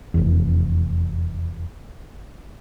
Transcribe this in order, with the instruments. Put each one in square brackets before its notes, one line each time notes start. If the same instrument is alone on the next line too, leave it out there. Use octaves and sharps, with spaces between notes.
[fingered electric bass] F1 E2